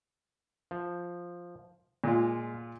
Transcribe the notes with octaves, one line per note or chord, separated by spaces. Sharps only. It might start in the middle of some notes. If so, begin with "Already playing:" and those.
F3
A#2 G#3 F4